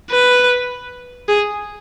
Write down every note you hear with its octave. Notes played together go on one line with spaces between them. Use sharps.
B4
G#4